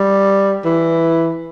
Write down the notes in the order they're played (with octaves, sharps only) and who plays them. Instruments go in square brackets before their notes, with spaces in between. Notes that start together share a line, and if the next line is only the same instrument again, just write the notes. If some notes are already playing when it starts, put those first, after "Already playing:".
Already playing: [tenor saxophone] G3
E3